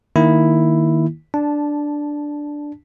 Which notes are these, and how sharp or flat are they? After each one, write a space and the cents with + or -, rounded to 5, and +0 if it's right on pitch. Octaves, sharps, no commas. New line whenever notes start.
D#3 +0 A#3 +0 E4 +0
D4 +0 A5 -10